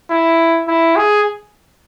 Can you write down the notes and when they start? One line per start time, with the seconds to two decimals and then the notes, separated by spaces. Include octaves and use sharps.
0.10 E4
0.68 E4
0.96 G#4